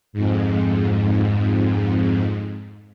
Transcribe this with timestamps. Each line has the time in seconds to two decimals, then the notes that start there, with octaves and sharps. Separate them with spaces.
0.13 F2 G#2